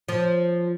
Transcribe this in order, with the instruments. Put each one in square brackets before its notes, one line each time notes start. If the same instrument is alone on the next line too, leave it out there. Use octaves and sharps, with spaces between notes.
[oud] F3